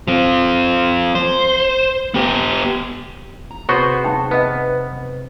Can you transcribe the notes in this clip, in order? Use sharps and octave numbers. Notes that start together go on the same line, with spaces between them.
F3 C4
C5
B3 G4
A#5
C3 B3 F#4 G#4 C5 C#5 C#6
D#4 G5
B3 B4 D#5